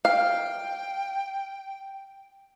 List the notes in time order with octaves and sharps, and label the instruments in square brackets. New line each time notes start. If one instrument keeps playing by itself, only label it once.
[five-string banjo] F5 [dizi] G5